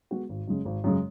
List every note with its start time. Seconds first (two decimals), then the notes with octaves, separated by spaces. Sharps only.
0.11 G#3 B3 F#4
0.29 G#1
0.48 F#2 C#3 G#3
0.65 G#1
0.84 F#2 C#3 G#3